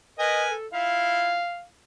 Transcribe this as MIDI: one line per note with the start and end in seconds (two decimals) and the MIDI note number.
0.19 0.52 70
0.19 0.52 71
0.19 0.44 75
0.19 0.52 80
0.50 0.67 69
0.73 1.40 64
0.73 1.40 65
0.73 1.64 77